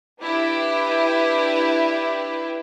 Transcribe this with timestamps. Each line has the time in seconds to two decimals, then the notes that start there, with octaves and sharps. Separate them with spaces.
0.22 D4 E4 G4 B4